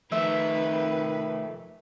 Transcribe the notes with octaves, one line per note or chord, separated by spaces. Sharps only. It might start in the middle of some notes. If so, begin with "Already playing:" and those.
D#3 F3 A3 B4 E5